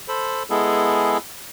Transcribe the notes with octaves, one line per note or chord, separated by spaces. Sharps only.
A4 C5 B5
G#3 B3 E4 G#4 A4